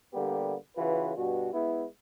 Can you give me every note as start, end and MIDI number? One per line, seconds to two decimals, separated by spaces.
0.13 0.54 50
0.13 0.54 55
0.13 0.54 58
0.13 0.54 59
0.13 0.54 67
0.77 1.12 49
0.77 1.12 52
0.77 1.12 65
0.77 1.12 66
0.77 1.12 71
1.16 1.52 43
1.16 1.52 47
1.16 1.52 66
1.53 1.85 56
1.53 1.85 59
1.53 1.85 64